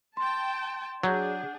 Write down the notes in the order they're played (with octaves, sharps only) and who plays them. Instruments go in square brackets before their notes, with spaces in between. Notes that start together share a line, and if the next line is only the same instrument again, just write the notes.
[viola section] G5 A5 [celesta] C6
[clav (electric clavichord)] F#3 [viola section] D4 G#4 [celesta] F#5 G6